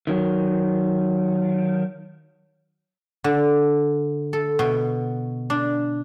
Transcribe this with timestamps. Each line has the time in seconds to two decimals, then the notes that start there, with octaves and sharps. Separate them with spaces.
0.07 D#3 F#3
3.24 D3
4.33 A4
4.59 B2
5.50 D4